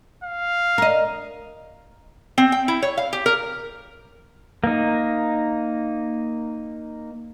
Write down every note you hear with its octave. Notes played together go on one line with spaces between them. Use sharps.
F5
A#4 D#5
C4
G5
E4
C#5
F5
G4
A#4
A#3 D#4